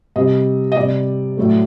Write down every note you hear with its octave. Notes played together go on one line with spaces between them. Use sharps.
C3 G3 D#5
D#5
C3 G3 D5
A2 F#3 A3